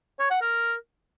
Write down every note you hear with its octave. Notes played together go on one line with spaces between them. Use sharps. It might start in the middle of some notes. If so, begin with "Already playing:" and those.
C#5
F#5
A#4